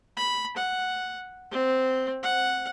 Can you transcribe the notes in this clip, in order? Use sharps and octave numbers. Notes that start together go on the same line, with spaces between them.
B5
F#5
C4
F#5